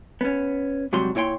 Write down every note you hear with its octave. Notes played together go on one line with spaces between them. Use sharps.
B3 C#4
G#2 C3 F#3 G3 F#4 C6
A#2 E4 C#5 G5 C6